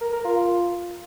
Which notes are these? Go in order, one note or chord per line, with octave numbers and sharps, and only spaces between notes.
A#4
A#4
F4